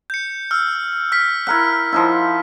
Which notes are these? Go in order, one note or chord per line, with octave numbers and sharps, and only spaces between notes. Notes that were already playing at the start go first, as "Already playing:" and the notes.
G6 C#7
E6 F6
F6 B6
E4 A#4 F#5 F6
F3 D#4 E4